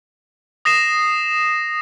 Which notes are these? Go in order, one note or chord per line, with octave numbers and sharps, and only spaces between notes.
D#6 A#6 C7 E7